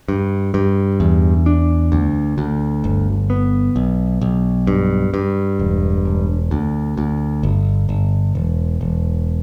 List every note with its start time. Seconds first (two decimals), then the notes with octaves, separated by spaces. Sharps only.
0.08 G2
0.54 G2
1.00 E2
1.46 D4
1.92 D2
2.38 D2
2.84 G1
3.30 B3
3.76 B1
4.21 B1
4.67 G2
5.14 G2
5.59 E1
6.05 E1
6.51 D2
6.98 D2
7.43 G1
7.89 G1
8.35 E1
8.81 E1